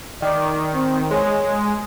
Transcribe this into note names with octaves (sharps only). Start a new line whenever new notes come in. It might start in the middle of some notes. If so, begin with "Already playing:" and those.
D#3 D5
C4
G#3 C#5